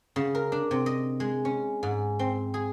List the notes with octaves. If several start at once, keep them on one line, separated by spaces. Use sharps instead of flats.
C#3
A#4
D4
C3
D#5
G#3
C#4
G#2
C4
G#4